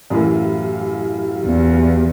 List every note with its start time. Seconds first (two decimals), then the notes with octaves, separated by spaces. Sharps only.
0.10 F#2 A2 E3 F#3 G4 F5
1.44 E2